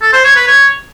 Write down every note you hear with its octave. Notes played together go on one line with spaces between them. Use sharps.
A4
C5
C#5
B4
C#5